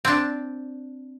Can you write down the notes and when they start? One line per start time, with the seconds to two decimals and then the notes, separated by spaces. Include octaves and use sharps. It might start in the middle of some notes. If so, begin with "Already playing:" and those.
0.05 C4 D4